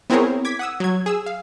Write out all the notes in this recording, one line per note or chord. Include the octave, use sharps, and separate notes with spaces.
B3 C4 E4 G#4 A#4 C#5
D6 G#6 B6
F#5 D#6 E6
F#3 G#6
G#4 E6
F5